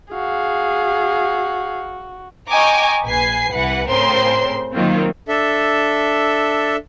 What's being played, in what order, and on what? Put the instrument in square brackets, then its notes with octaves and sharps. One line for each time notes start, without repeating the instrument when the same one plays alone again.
[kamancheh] F#4 [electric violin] G#4 F5
[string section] D#5 G5 G#5 A#5 C#6 D6
A#1 B4 G#5 C7
C2 E3 B4 F#5
A2 C#3 C4 A#4 C5 C6
D#3 F#3 A#3 C4 F4
[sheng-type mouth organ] D4 A4 E5